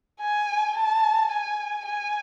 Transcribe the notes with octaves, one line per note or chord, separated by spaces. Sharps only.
G#5
A5
G#5
G#5